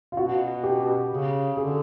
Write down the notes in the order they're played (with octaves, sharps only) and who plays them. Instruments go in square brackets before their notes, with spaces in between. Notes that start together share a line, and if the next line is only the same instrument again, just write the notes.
[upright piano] F4
[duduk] B2 [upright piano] F#4
[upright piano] G4
[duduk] C#3
[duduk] D3 [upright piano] G#4